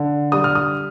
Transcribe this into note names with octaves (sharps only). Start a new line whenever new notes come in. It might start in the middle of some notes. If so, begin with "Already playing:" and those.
Already playing: D3
G3 D#6
F6
D#6